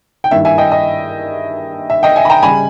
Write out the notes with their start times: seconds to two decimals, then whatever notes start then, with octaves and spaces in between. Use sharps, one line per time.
0.24 G5
0.31 G2 D#3 A#3 E4 E5
0.45 E5 G#5
0.58 D#5 G5
0.72 D#5
1.90 E5
2.03 D#5 G5
2.16 E5 G#5
2.25 B5
2.30 G5 A#5
2.42 C#3 G3 G#5 B5